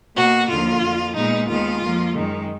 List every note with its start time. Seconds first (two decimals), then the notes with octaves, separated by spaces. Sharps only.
0.16 B2 A#3 F#4
0.50 D#2 D3 F3 A#3 F4
0.82 F2 F3 A#3
1.16 A#2 G#3 B3 D#4
1.49 D#2 D#3 G#3 B3 F4
1.82 F2 F3 A#3
2.15 F#2 D#3 G#3